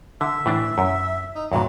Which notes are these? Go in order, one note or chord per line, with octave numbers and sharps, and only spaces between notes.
D3 E5
A2 E3 D4
F#2
D#4
E2 G2 A#2 F#3